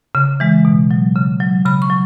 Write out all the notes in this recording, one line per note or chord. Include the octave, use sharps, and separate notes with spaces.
C#3
E3 G#3
B2
F#3
C#3
F#3
C#3 B5
C#6
F#3